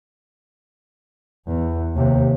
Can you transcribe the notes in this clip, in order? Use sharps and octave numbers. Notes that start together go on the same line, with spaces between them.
E2
D#2 C3